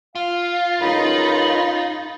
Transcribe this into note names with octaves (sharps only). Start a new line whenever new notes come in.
F4 F5
C#2 F#2 D#4 B5